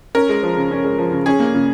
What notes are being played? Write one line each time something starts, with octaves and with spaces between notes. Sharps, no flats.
C#4 A#4
G#3
F3
C#3
C#4
G#3
F3
C#3
C#4 G#4
A#3
C#3